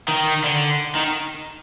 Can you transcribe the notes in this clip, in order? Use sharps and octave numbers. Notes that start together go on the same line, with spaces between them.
D#3
D3
D#3